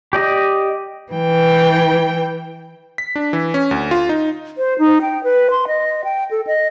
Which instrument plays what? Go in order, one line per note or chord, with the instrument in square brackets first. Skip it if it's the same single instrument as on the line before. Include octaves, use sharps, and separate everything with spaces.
[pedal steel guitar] G4 D5 D#5
[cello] E3 G5
[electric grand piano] B6
D4
E3
C#4
D2
F4
D#4
[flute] C5
D#4
G5
B4
C6
D#5
G5
A4
D#5